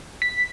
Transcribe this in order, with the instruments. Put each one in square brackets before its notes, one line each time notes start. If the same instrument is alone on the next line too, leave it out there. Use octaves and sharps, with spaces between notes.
[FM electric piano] B6